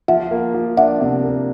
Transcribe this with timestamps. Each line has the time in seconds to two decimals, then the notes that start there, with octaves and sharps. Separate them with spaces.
0.08 F3 E5 F#5
0.31 A#3
0.54 F3
0.77 D4 E5 F#5
1.00 C3
1.24 A#3